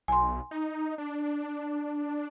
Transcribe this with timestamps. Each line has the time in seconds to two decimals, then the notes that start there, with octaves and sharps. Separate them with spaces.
0.08 B1 G#5 C6
0.51 D#4
0.98 D4